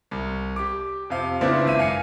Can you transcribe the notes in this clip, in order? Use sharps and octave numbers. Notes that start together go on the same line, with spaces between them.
C2
G4 D6
F2 C3 F5
A#2 C#3 B3 C4 D4 E4
G#1 E5 D#7
F#2 F5 G#5 C#7